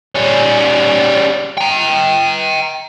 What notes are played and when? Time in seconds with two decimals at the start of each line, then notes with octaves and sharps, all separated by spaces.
0.15 G3 C#4
1.58 G5 A#5